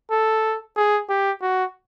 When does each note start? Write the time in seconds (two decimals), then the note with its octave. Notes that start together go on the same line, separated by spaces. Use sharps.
0.11 A4
0.76 G#4
1.09 G4
1.41 F#4